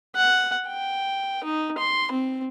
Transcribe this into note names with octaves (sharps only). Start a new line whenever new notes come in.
F#5
G5
D#4
C6
C4